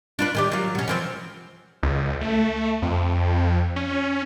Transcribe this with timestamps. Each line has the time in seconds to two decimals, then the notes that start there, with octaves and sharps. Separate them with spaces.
0.19 D4 F4 B4
0.35 D#3 G4 D5
0.52 F#3 F4
0.75 B2 C#4
0.88 E3 F3 C4
1.83 C#2
2.21 A3
2.82 F2
3.76 C#4